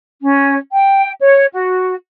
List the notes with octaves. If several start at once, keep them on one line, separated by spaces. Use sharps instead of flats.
C#4
G5
C#5
F#4